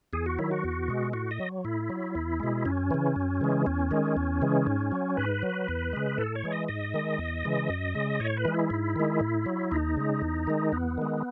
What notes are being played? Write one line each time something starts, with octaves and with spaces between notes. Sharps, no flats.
E2 G#4
F#4
D#3 F#3 E4
F#4
E2
B2 G#3
A2 F#4
D#5
F#3
A2 E4
F#3
E2
B2 G#3
F#2 C#4
C#3 E3
F#2
C#3 E3 G#3
E2 C#4
D#3 G#3
E2
C#3 E3 G#3
G#2
F#3
G#2 B4
F#3
E2
C#3 G#3
A2 A4
C#5
E3 G#3
D#5
G#2 D#5
D#3 G#3
E2
C#3 E3 G#3
F#2
C#3 G#3
A2 C#5
B4
E3 G#3
E4
G#2
D#3 G#3
A2
F#3
D#2 D#4
C#3 G#3
E2
D#3 G#3
E2 B3
D#3 G#3